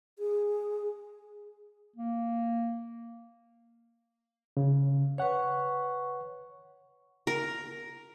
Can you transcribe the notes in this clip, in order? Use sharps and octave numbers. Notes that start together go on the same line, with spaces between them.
G#4
A#3
C#3
B4 C#5 F#5 C#6
A#4